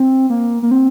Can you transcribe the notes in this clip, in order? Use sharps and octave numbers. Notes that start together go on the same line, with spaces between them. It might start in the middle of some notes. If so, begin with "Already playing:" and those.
Already playing: C4
A#3
A#3
C4